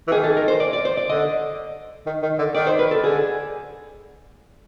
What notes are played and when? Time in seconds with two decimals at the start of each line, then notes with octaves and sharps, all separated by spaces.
0.08 E3
0.12 D#3 G#4
0.24 A4
0.37 A#4
0.48 C5
0.60 D5
0.73 D5
0.85 C5
0.97 D5
1.09 D3 D#5
2.06 D#3
2.22 D#3
2.38 D3
2.55 D#3 D5
2.67 C5
2.79 B4
2.91 A4
3.03 D3 G#4